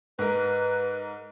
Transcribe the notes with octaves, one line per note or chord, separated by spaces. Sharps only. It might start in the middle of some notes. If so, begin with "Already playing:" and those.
G#2 A#4 B4